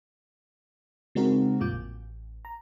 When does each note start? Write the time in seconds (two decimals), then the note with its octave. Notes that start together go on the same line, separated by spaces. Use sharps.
1.15 C#3 G#3 C4 D#4 F#4 A#4
1.60 F2 A#2 G3 F4 D6 G6
1.72 A1
2.45 A#5